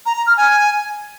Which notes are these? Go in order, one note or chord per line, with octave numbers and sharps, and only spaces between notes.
A#5
A#5
F6
G#5